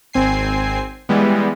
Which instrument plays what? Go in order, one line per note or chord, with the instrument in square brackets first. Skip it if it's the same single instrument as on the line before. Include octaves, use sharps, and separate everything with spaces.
[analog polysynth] G#1 C4 G#5 C7
E3 G3 G#3 B3